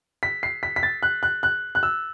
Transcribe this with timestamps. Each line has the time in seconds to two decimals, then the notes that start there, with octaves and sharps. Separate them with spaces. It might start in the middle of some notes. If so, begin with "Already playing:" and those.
0.23 B6
0.43 C7
0.63 B6
0.76 B6
0.83 A6
1.03 F#6
1.23 F#6
1.43 F#6
1.75 F#6
1.83 E6